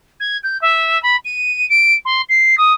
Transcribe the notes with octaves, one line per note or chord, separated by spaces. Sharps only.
G#6
G6
E5
B5
D#7
D7
C6
C7
D#6